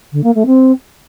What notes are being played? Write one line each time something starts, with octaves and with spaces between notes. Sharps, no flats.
D3
A#3
A3
C4